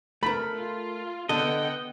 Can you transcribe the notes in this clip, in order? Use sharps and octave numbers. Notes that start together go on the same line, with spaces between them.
A3 A#4 B5
F4
D3 B3 A4 D#5 F#5 G5